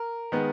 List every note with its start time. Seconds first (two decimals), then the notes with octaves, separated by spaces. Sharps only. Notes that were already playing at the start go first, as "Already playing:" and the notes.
Already playing: A#4
0.32 D#3 G#3 B3